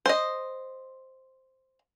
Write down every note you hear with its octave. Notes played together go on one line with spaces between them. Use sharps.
C5 D#5